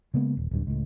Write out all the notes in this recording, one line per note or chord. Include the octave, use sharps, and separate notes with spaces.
C#3 G#3 A#3 B3
D#1
D1 G2
C#2 A2